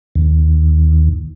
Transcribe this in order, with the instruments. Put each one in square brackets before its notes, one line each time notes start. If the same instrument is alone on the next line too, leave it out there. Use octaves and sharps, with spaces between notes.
[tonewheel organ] D#2